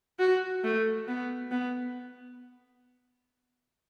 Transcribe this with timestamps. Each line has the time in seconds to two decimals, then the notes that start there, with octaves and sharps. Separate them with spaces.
0.19 F#4
0.64 A3
1.07 B3
1.51 B3